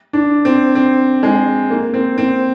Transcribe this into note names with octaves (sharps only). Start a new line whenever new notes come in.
D4
C4
C4
G#3
A#3
C4
C4